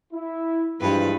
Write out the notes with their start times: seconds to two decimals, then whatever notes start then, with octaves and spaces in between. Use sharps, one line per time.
0.13 E4
0.81 G2 E3 F3 G#3 B4